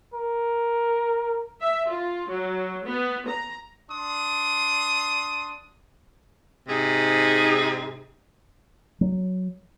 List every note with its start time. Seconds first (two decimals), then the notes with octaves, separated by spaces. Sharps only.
0.14 A#4
1.61 E5
1.89 F4
2.29 F#3
2.87 B3
3.29 A#5
3.90 D4 C6 D#6
6.68 G#2 C3 D#4 G#4
9.01 F#3